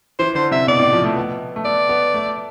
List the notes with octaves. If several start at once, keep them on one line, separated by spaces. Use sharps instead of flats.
E3 C5
D3 C5
C3 E5
B2 D5
A2
F3
A3
B3
A3
B3 D5
B3
A3